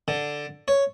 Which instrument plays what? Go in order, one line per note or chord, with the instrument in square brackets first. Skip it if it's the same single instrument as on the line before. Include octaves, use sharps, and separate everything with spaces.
[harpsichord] D3
C#5